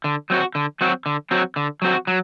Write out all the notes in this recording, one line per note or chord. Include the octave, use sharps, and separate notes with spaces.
D3
F#3 C4 F#4
D3
F#3 C4 F#4
D3
F#3 C4 F#4
D3
F#3 C4 F#4
F#3